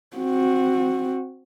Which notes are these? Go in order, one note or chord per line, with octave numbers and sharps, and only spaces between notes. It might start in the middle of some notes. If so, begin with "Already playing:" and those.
C4 F#4